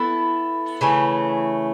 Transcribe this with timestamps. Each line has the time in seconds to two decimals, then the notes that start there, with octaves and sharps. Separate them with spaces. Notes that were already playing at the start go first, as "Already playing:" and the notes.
Already playing: B3 E4 A4
0.81 C#3 E3 A3